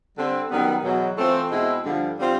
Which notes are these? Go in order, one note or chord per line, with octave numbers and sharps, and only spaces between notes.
D3 G3 C4
F#2 D#3 G3 B3
E2 B2 F#3
E3 A3 C4 F4
B2 G#3 C4 E4
G2 D3 F3
D3 G3 C4 F4